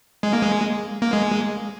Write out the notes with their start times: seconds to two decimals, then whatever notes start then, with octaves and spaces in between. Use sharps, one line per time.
0.23 G#3
0.33 A#3
0.42 G#3
1.02 A#3
1.13 G#3